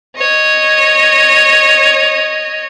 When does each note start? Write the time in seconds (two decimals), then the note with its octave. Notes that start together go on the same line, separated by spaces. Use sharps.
0.17 C#5 D#5